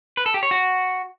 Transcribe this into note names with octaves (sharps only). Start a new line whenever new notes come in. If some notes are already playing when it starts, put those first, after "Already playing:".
B4
A4
G4
C#5
F#4